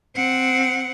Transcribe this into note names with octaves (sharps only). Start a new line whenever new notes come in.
C4 F#5